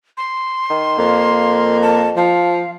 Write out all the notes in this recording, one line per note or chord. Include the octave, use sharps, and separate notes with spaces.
C6
D#3
F2 A#3
A5
F3 F5